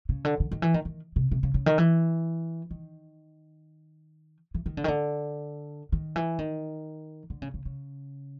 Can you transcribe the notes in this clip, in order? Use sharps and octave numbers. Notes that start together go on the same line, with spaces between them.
C#3
D3
D3
D#3
E3
D#3
D#3
C3
C3
C#3
C#3
D#3
E3
D#3
E3
D#3
D3
D#3
D3
D#3
E3
D#3
D3
C#3
C#3
C#3